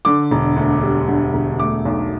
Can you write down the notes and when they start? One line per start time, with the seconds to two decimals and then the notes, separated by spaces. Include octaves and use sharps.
0.05 D3 D6
0.31 E1
0.56 D2
0.83 G3
1.08 D3
1.34 E1
1.60 A3 D6
1.85 B1